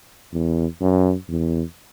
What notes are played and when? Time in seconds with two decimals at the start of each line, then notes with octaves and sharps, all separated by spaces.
0.33 E2
0.81 F#2
1.29 E2